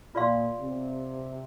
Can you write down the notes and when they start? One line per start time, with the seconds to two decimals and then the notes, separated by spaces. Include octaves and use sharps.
0.14 A#2 F4 D5 F5 C6
0.60 C3